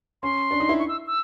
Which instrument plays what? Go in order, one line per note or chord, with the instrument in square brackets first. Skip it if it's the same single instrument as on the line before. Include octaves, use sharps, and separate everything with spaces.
[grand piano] C#4 [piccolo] C6
[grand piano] D4
D#4
E4
[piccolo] C#6
E6
E6